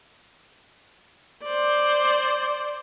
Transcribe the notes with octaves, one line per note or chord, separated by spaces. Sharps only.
C5 D5